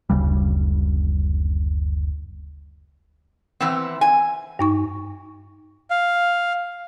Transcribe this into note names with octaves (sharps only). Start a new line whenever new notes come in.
F#1 D2 C#3 G3
E3 B3 C4
G#5
G2 D#4 C#6
F5